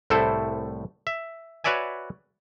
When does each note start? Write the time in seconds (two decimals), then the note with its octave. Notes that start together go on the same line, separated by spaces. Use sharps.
0.10 C2 A2 A3 E4 A4 C5
1.07 E5
1.64 F#4 B4 C#5 D5 E5 G#5